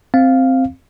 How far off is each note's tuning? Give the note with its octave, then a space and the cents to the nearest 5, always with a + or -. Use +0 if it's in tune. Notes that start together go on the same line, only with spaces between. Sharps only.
C4 +0 F5 +0